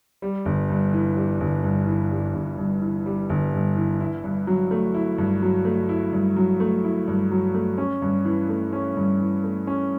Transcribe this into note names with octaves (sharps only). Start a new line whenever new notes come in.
G3
G1
G2
E3
G3
G1
G2
E3
G3
G1
G2
E3
G3
G1
G2
E3
E4
G2
F#3
A3
E4
G2
F#3
A3
E4
G2
F#3
A3
E4
G2
F#3
A3
C#4
G2
E3
A3
C#4
G2
E3
A3
C#4